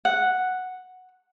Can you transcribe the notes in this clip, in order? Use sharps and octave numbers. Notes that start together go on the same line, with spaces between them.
F#5